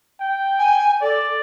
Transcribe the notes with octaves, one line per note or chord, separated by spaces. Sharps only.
G5
G#5
A4 D5